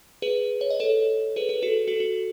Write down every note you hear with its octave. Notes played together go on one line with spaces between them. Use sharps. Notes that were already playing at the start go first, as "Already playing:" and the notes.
G#4 B4
C#5
D#5
A4 C#5
G#4 B4
G#4 B4
F#4 A4
F#4 A4
F#4